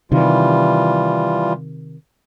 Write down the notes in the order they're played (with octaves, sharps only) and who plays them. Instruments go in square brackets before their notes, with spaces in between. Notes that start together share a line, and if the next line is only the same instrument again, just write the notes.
[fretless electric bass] C3 D#3 [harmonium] E3 G3 F4